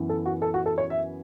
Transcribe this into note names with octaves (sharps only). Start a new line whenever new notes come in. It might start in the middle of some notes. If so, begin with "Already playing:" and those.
Already playing: F#2 E3 B3
A4
F#4
A4
F#4
A4
C#5
E5